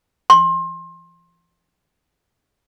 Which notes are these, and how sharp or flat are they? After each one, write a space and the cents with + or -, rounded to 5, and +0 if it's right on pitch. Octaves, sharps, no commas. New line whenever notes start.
C6 +25